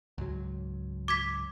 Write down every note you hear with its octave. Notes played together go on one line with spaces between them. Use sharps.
C#2 G#2 F#3
D6 G#6 B6